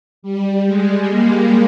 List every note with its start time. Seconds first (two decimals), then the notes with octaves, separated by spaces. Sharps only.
0.22 G3
0.66 G#3
1.09 A#3